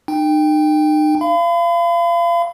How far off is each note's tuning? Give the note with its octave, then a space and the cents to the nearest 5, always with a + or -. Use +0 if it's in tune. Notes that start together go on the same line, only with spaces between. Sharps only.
D#4 -40 G5 +15
F5 -30 B5 +35